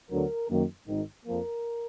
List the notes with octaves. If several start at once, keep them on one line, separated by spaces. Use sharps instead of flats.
D2 D3 F#3 B3 A#4
F#2 D#3 A#3
G#1 G#2 D#3
F2 F3 A#3 A#4